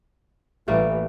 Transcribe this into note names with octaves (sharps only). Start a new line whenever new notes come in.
A1 E3 G3 A3 A#3